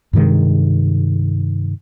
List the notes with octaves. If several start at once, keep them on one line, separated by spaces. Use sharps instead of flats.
G2 C3 D#3 G#3